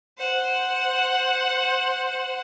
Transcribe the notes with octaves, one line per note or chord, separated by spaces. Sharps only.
C5 F#5